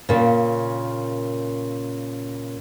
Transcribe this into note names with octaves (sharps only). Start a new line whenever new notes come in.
A#2 C#3